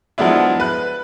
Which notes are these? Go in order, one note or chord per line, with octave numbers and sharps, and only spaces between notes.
F3 F#3 G#3 B3 D4 E4
B4 F#6